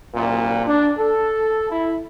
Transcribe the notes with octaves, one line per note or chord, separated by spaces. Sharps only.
C2 F#2 A#2
D4
A4
E4